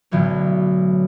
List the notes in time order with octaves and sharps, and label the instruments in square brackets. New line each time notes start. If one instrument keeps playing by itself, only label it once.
[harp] B1 A2 D3 E3 F#3